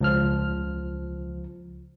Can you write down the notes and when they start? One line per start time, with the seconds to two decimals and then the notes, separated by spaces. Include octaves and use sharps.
0.01 C#2 F3 F6